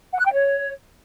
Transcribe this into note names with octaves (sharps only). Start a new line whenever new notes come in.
F#5
F#6
G5
C#5